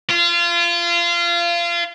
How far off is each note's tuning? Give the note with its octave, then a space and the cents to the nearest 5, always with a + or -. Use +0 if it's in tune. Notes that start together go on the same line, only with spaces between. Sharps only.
F4 -25